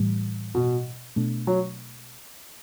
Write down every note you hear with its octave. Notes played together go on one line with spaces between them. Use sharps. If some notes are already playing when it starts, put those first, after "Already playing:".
Already playing: A2 E3 G3
B2
B2 A3 D4
F#3